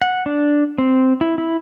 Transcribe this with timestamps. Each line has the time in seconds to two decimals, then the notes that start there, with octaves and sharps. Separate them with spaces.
0.02 F#5
0.26 D4
0.78 C4
1.21 E4
1.38 E4